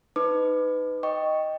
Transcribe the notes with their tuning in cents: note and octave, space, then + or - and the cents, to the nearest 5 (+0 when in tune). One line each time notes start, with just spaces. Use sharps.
D#4 +0 B4 +20 D6 +25
D#5 +0 G5 +0 C#6 +0